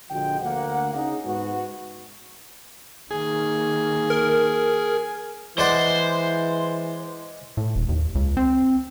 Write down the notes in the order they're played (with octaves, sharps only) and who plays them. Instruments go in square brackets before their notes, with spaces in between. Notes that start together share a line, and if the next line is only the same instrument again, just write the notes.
[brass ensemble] A#1 D3 F3 G#3 F#4 G5
D2 A#3 F#5
C#3 D#4 G#4
G#2 G#3 B3 F#4
[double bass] D#3 A#3 [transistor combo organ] G#4
[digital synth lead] A#4
[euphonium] E3 [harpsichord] G#3 D5 F#5 [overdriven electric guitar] C5
[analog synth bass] A2
E1
D#2
C#2
C4